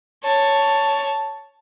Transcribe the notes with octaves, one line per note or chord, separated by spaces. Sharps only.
C#5 A5